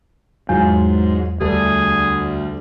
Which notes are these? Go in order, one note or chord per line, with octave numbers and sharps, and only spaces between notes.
E2 G#2 F#3 F4
D2 G3 A3 G#4